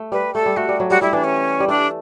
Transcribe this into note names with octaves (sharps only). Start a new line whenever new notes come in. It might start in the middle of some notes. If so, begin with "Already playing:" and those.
Already playing: A3
G3 B4
A3 A4
G3
A3 F#4
G3
F#3
G3 F#4
G3 E4
E3 D4
C#4
G3
A3 D4